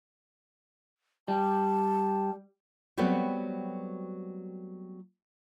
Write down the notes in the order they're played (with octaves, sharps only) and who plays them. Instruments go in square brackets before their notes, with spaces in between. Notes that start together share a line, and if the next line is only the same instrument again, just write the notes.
[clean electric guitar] G3 [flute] A5
[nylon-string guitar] F#3 G3 A3 B3 C4 F#4